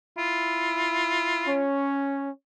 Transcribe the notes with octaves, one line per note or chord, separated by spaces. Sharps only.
E4 F4
C#4 C#5